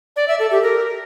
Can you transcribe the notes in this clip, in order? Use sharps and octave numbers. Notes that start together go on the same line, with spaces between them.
D5
E5
A4
G4
A#4